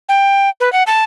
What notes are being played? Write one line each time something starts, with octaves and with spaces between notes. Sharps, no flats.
G5
B4
F#5
A5